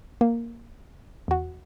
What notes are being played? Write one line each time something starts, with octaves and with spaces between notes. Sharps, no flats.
A#3
E2 F#4